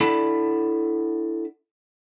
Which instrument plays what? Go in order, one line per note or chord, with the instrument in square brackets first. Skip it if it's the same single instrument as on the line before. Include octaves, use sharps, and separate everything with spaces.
[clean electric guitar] D4 E4 A4 D5 F#5 B5